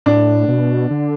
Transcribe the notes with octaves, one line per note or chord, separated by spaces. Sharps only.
A2 D4
B2
D3